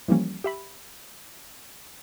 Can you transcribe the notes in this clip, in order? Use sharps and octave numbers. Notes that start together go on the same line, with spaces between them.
E3 F3 G3 A#3 C#4
G4 E5 B5